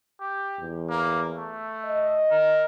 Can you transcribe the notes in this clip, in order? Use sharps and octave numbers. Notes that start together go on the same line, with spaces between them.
G4
E2
A#3
A3
D#5
A#4